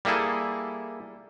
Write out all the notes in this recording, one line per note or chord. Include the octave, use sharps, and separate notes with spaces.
G3 A#3 E4 G#4 A4